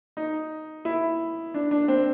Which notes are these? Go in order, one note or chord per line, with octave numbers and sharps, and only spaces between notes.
D#4
E4
D4
D4
C4